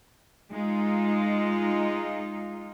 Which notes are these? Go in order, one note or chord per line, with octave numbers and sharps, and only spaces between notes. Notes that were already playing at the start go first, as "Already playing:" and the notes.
G#3 D#4 F4